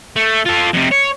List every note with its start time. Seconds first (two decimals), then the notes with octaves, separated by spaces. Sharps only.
0.16 A3
0.46 F4 A4
0.74 F2 C3
0.92 C#5